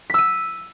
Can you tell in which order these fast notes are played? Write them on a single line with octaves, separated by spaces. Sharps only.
B6 E6 D#7